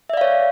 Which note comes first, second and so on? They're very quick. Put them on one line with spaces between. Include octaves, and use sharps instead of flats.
E5 D5 F5 C#5